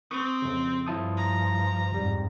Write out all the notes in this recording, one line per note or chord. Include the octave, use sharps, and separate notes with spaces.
C4 C#6 D#6
F2 C#3
G2 F3 E4 A5 D#6
A#5
F2 G#2 G3